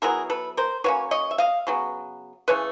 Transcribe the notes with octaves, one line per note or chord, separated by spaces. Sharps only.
F#3 B3 E4 G#4 A#4
A4 B4
A#4 C5
F#3 A#3 C#4 B4 C#5
C#5 D#5
E5
D#5 F5
C#3 F#3 B3
C#3 E3 A3 B4 C#5